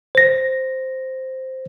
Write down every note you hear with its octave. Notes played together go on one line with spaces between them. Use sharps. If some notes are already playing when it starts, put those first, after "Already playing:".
C5 A#6